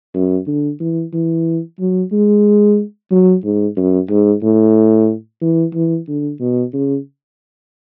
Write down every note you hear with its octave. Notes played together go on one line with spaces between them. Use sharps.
F#2
D3
E3
E3
F#3
G#3
F#3
G#2
F#2
G#2
A2
E3
E3
D3
B2
C#3